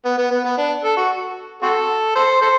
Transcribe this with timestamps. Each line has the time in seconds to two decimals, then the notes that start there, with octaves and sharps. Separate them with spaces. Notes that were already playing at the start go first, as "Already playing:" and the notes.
0.05 B3
0.18 B3
0.31 B3
0.44 B3
0.58 D4
0.84 A4
0.97 F#4
1.62 C4 F#4 A4
2.15 A4 C5
2.41 A4 C5